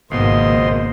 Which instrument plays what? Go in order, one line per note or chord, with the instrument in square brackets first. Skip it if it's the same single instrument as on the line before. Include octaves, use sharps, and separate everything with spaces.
[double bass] G#1 [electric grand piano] C#2 B2 [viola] A#3 [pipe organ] C5 D#5 C6